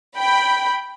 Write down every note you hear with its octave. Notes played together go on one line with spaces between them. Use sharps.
G5 B5